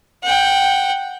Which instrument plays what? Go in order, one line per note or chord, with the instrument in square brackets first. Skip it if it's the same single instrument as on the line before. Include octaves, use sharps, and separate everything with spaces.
[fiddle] F#5 G5